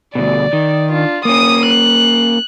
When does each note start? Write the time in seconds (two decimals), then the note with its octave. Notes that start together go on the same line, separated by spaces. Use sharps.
0.15 D2 B2 D5
0.53 D#3
0.91 D4 F4
1.25 A#3 C#4 D#6 D#7
1.66 F#6